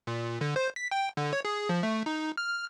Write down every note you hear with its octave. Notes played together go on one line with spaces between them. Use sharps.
A#2
D3
C5
B6
G5
D3
C#5
G#4
F3
A3
D#4
F6